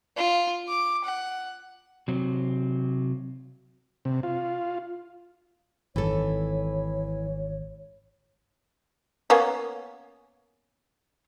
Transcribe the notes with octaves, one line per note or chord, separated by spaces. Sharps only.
F4
D6
F#5
C3 F#3 C4
C3
F4
G#1 E3 A4 C#5
A#3 B3 C#4